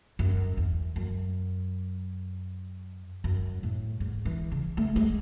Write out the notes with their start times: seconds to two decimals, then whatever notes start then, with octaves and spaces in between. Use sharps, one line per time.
0.19 F#2
0.57 E2
0.96 F#2
3.24 F#2
3.63 A2
4.00 G#2
4.25 E3
4.52 C#3
4.77 A3
4.96 G#3